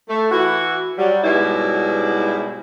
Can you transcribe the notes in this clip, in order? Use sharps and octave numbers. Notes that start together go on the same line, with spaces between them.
A3
E3 E4 F#4
F#3 G3
G#2 B2 F#3 G3 E4